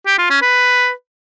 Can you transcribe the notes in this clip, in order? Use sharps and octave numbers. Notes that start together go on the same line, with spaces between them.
G4
F4
C#4
B4